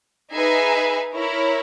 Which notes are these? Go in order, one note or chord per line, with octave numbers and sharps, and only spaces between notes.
D#4 G#4 B4 E5 G#5
E4 A#4 C#5